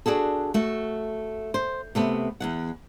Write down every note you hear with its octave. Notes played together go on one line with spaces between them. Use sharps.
D4 F#4 G#4 A4
A3 F#4
C5
C3 A3 B3
E2 G2 F#5